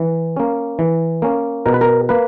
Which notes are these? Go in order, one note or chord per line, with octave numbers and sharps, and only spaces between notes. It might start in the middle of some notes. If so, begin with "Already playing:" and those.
Already playing: E3
A#3 C#4
E3
A#3 C#4
B2 A#4
B4
A#4
A#3 B4